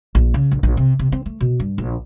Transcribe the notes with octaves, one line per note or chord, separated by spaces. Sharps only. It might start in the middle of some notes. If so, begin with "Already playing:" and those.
A#1
C#3
A#1
A#1
C3
C3
C4
A3
B2
G2
A#1